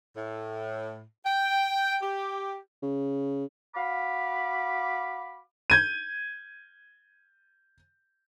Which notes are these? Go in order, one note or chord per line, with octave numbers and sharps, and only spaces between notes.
A2
G5
G4
C#3
F#4 F5 B5 D6
G6 G#6 D#7